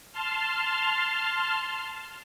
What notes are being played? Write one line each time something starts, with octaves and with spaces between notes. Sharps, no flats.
A5 C6 F6